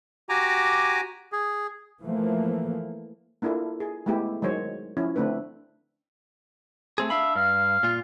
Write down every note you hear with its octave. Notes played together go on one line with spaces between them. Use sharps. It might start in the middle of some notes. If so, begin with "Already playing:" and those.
F#4 G4 G#5 A#5 D6
G#4
E3 F3 A3 A#3
A#3 D4 E4 F4 A4
G#4
G#3 A3 B3 E4 G4
D#3 F#3 G#3 C5 C#5
F3 C#4 E4
D3 A3 C4 D4 B4
A3 C4 G#4
D4 E5 F5 B5
G2 F5
A#2 F4